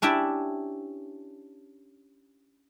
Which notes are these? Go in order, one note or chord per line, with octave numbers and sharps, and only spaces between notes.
C#4 D4 E4 G4 D5